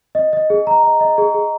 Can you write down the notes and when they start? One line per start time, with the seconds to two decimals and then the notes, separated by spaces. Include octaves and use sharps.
0.15 D#5
0.33 D#5
0.50 G#4
0.67 A#5
0.83 D#5
1.01 D#5
1.18 G#4
1.34 G#4